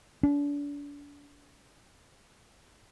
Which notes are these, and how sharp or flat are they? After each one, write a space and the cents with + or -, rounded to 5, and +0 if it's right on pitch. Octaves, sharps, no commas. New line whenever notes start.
D4 -35